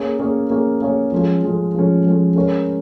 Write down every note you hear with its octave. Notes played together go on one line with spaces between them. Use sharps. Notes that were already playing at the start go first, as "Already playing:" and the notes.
Already playing: A#3 C#4 G#4 C#5
A#3 C#4 G#4 C#5
A#3 C#4 G#4 C#5
A#3 C#4 G#4 C#5
F3 G#3 C#4
F3 G#3 C#4
F3 G#3 C#4
F3 G#3 C#4
G#3 C#4 A#4 C#5